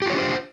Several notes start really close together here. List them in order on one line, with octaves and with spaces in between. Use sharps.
G4 F4 C#5 D4 C5